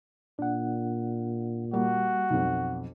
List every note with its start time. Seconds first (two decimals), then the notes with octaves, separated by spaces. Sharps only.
0.39 A#2 D4 F#5
1.74 G3 A#3 F#4
2.30 B1 F2